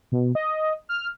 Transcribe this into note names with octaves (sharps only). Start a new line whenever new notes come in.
B2
D#5
F6